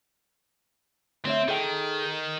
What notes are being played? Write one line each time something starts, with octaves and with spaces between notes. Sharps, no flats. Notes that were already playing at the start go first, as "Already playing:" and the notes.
D2 C4 C#5 E5
D#3 G#4 A4 G5